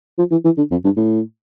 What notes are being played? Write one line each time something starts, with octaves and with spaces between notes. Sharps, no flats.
F3
E3
E3
D3
F2
G2
A2